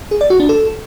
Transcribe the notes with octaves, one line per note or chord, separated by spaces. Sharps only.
G#4
D5
F#4
D4
A4